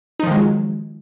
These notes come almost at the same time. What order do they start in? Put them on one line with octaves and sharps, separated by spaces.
D#4 F3 D#3 G#3 F#3